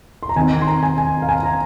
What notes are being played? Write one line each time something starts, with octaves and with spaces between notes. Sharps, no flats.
C6
A#5
D#3 C4 D#4 G#5
C6
A#5
G#5
G#5
F5
G#5
A#5